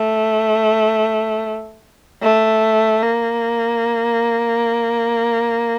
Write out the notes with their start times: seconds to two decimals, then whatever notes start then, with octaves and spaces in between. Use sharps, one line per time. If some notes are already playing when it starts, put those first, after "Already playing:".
Already playing: A3
2.22 A3
3.03 A#3